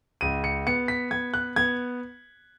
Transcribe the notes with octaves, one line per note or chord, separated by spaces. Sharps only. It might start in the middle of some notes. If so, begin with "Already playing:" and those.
C#2 D#7
C#7
B3 C#7
B6
B3 G#6
F#6
B3 G#6